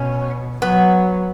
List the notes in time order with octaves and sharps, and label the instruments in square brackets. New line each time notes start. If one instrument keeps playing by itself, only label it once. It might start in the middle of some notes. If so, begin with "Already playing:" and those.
Already playing: [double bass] B2 [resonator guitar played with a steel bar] C#4
[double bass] F#3 [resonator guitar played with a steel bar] B3